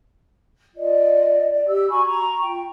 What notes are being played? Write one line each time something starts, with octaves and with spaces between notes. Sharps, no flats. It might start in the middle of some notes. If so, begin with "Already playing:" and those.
F4 D5 D#5
D5
G4 E6
F#4 G#5 B5 C#6
A#5 C#6
F4 G5